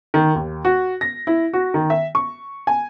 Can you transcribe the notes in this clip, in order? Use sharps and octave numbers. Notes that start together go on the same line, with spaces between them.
D#3
D#2
F#4
A#6
E4
F#4
D#3
E5
C#6
G#5